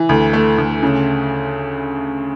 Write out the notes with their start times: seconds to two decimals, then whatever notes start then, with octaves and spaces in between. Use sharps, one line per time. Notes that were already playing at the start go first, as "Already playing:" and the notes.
Already playing: E3
0.09 D2
0.33 A3
0.58 D2
0.83 C#3